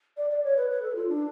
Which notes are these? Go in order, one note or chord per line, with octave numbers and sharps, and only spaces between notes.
D5
D5
C#5
B4
B4
A4
F4
D4